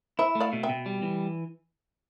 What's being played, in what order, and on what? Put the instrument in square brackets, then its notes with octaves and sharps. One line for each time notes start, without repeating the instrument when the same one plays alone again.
[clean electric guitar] E4 [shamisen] C5 E5
[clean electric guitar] A3
[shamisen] D5 F5
[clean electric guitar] B2
[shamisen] E5 G5
[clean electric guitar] B2
G3
E3